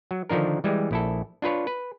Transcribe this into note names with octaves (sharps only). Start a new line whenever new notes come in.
F#3
D3 D#3 F3 D4 A#4
E3 G3 G#3
A#1 E4 A4
D4 F4 B4 C#5
B4